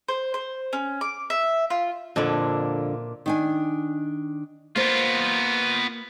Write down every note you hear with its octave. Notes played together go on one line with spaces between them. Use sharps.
C5
C5
C#4
D6
E5
F4
F2 A#2 D3 D4 E4
D#3 D4 G#5
A#3 B3 F4 C5